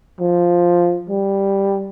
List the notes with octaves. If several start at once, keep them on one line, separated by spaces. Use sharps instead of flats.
F3
G3